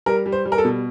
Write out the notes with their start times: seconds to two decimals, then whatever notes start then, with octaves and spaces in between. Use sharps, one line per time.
0.06 G3 A#4
0.26 G3
0.32 C5
0.45 G3
0.52 A#4
0.58 A4
0.65 B2